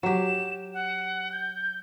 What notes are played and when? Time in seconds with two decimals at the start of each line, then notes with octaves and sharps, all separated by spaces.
0.03 F#3 G4 E7
0.74 F#5
1.32 G6